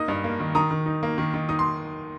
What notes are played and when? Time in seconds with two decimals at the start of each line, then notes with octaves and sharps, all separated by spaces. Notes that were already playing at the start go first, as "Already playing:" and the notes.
Already playing: A#3 D#4 D#5
0.08 G2
0.24 A#3
0.40 D#3
0.55 D#3 A#5 D#6
0.71 D#3
0.86 D#4
1.03 A#3
1.18 D#3
1.34 D#3
1.49 D#4 D#6
1.59 C6